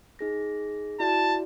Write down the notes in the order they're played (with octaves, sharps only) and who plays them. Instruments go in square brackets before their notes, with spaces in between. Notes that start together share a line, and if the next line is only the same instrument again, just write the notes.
[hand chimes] D#4 G#4 A#6
[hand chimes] E4 F#4 D5 [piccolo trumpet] A5